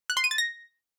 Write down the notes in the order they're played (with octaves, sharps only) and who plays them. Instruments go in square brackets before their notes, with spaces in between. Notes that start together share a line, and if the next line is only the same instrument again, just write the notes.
[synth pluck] F#6
C6
D#7
A6
A#6